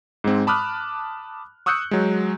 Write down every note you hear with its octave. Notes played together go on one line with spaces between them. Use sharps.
G#2 G#3 C4
A5 B5 D6 D#6 F6 F#6
C#6 D#6 E6 F#6 G6 C#7
F#3 G#3